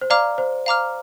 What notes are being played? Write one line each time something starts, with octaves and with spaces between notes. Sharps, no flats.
C5
D5 F5 A#5 D6 F6
C5
F5 A#5 D6 F6